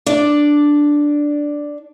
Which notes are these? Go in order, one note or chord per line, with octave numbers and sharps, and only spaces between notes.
D4 D5